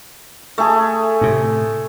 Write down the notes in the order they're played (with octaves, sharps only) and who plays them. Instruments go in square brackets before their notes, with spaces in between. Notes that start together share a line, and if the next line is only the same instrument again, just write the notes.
[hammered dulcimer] A3 G#4
[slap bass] A2 C3